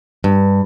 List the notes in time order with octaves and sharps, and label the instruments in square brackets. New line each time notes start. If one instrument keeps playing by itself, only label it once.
[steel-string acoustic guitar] G2